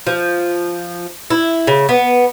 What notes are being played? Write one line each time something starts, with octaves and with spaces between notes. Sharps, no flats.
F3
E4
C#3
B3